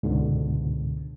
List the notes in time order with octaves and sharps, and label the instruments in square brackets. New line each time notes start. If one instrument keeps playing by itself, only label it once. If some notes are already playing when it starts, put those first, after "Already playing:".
[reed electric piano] C#2 G#2 B2 D3